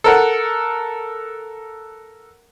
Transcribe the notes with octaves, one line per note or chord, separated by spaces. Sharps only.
A4 A#4 F#5